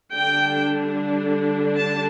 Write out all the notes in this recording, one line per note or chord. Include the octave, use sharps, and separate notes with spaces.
D3 G3 D4 G5
A5